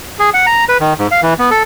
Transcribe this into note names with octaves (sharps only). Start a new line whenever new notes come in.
G#4
F#5
A#5
B4
D#3
G#2
F5
E3
B3
A4